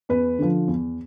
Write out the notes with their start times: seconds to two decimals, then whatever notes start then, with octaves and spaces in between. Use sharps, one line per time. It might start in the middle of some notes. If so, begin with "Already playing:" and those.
0.09 E2 B4
0.39 D3 F3
0.68 E2